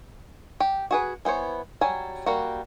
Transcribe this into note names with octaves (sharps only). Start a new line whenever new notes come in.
G4
F#4 G#4 B4
E3 B3 C5 C#5
F#3 G3 G#5
G3 A#3 F#4